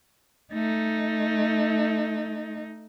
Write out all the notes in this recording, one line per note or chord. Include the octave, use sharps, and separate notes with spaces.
A3 D#4